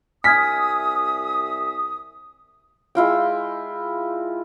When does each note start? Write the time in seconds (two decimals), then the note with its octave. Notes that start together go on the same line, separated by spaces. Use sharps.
0.24 C2 E5 G#5 D#6 F6 G#6 B6
2.95 G#3 E4 F4 G5